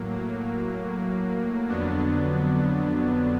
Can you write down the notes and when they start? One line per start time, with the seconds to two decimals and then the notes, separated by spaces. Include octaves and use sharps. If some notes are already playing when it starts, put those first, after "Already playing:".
Already playing: A2 F#3 A#3
1.68 F2 D3 F#3 B3 D4